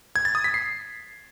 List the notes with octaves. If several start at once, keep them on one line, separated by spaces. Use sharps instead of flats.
G#6
A6
D#6
B6
C7